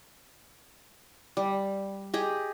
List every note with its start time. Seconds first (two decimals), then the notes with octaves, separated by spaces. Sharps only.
1.37 G3
2.14 G4 G#4 D#5